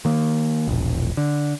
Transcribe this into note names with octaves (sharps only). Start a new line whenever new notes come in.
D#3 A#3
E1 A#1
D3